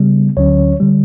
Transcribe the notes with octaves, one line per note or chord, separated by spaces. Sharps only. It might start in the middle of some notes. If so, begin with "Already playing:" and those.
Already playing: C#3 G3 B3
D2 D3 F#3 C#4 C#5
D3 G3